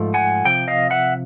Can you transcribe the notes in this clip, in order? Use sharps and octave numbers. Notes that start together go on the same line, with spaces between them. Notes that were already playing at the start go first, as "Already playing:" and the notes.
Already playing: G#2 F3 A3
F#5 G#5
C3 F3 G5
D#5 F5
E5 F#5